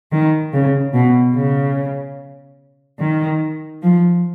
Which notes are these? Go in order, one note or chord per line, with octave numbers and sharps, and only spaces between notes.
D#3
C#3
B2
C#3
D#3
F3